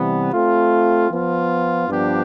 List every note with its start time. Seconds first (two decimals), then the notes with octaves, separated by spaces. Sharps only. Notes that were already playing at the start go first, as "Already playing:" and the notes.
Already playing: C3 E3 G3 B3
0.32 A3 C4 F4
1.11 F3 B3 F4
1.89 G2 F3 B3 D4 G4